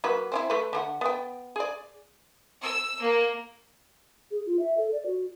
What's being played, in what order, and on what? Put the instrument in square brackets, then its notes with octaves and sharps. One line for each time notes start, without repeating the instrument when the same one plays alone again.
[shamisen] F#3 A#3 B4
C4 C#4 E4
A3 B4
D3 F4 F#5
B3 G5
G#4 D5
[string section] E6
A#3
[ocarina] G#4
F4
E5
A4
D5
F#4